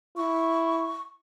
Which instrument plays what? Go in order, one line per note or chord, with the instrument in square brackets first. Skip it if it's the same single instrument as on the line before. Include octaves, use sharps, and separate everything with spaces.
[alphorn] E4 [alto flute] C#6